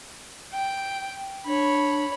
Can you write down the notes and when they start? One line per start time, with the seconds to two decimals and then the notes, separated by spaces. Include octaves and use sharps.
0.52 G5
1.46 D4 C#5 B5